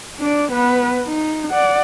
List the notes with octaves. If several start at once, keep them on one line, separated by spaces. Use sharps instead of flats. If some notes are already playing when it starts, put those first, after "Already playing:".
D4 D5
B3 B4
D#4
D5 F#5